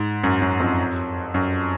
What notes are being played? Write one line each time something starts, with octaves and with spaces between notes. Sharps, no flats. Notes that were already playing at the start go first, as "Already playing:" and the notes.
Already playing: G#2
F#2
F#2
F2
F#2